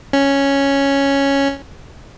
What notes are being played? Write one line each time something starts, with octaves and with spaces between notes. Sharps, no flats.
C#4